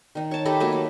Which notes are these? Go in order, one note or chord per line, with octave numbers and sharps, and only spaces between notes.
D#3 D#4
C#5 A5
D#4 G4 A4 B5
F#3 A3 A#3
B5